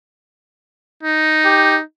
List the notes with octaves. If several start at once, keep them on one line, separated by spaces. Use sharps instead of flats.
D#4
G4